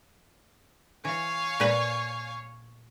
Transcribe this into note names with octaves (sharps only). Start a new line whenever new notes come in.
E3 C#5 F5 G#5
A#2 B4 A#5